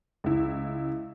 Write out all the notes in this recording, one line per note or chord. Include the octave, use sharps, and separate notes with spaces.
C#2 E4